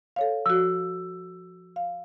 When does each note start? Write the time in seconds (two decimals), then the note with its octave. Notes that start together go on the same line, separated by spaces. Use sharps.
0.16 A4 C#5 F5
0.46 F3 F#4 E6
1.76 F5